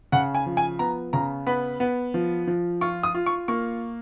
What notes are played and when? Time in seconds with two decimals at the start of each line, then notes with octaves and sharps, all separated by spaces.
0.12 C#3 F#5
0.35 G#5
0.46 F3
0.57 G#5
0.79 B3 A#5
1.13 C#3 A#5
1.47 B3 B5
1.80 B3
2.14 F3
2.47 F3
2.81 F4 C#6
3.03 D#6
3.14 F4
3.26 C#6
3.48 A#3 C#6